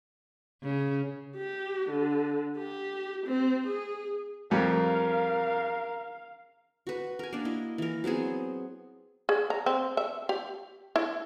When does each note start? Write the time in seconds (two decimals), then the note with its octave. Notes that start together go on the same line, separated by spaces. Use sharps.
0.63 C#3
1.37 G4
1.90 D3
2.57 G4
3.26 C4
3.67 G#4
4.51 F2 G3 A#4 F5
6.87 F#4 B4
7.19 A#4 G#5
7.33 A#3 D4
7.45 E4 D#5
7.78 E3 A#4
8.04 F#3 B3 C4 G#4
9.29 G#4
9.50 A#5
9.66 C4
9.97 E5
10.29 G4
10.96 E4